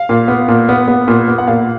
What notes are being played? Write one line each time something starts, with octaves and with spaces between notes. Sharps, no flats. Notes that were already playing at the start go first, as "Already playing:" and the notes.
Already playing: F5
A#2
B3
A#2
B3
B3
A#2
B3
F#5
A#2 F5